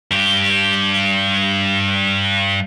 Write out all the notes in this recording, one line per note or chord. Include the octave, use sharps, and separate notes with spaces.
G2 G4